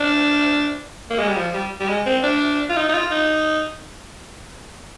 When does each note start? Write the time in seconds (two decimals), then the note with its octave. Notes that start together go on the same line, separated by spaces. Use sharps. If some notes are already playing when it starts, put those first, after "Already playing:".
Already playing: D4
1.11 A#3
1.19 G#3
1.28 G3
1.37 F3
1.54 G3
1.80 G3
1.89 G#3
2.06 C4
2.23 D4
2.70 F4
2.77 D#4
2.89 D#4
2.94 F4
3.11 D#4